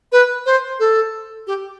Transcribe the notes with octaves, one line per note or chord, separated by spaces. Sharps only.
B4
C5
A4
G4